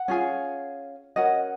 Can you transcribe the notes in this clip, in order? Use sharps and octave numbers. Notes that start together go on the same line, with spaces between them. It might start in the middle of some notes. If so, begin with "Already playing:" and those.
Already playing: F#5
C#4 F4 G#4
C#4 F#4 A#4 D#5 F#5